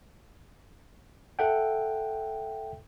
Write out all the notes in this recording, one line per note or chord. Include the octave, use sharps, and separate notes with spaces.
A4 E5 F#5 G5